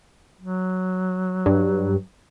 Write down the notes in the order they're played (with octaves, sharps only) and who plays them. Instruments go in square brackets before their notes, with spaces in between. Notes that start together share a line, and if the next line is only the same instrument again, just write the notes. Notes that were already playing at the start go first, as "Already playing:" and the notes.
[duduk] F#3
[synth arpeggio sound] G2